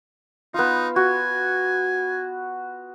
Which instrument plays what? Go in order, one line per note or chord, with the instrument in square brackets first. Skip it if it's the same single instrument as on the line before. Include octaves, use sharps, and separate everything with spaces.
[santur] B3 F4 [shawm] D#4
[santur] F#4 [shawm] G#5